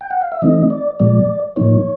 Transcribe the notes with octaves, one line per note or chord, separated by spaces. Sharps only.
G5
F#5
F5
E5
E3 A3 C4 D#4 D#5
D5
A#2 F3 G#3 D5
A2 F3 A#3 D#4 C#5